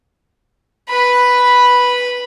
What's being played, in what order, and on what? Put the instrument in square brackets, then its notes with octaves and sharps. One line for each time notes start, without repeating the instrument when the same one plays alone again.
[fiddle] B4 B5